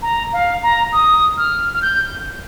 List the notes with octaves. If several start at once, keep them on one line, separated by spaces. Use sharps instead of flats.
A#5
F5
A#5
D#6
F6
F6
G6